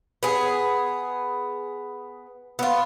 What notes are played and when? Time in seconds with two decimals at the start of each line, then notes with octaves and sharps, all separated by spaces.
0.23 B3 G#4
2.59 B3 F4